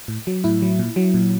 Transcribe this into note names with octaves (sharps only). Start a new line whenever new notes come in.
A2
F#3
A2 E4
F#3
A#2
F#3
A#2